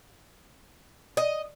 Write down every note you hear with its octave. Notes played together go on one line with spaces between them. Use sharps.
D#5